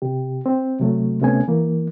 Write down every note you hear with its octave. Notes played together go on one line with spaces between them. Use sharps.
C3 G4
C4
C3 F#3 A3
D2 C3 A3 B3 C#4 G#5
E3 A#3